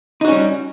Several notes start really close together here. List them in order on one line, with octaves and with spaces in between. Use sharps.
D#4 F#4 C#4 G3